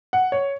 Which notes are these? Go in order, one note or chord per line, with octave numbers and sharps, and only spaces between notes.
F#5
C#5